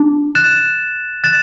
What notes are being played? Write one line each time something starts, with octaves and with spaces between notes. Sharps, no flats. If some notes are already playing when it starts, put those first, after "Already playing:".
Already playing: D4
F#6 A6 E7
F#6 A6 E7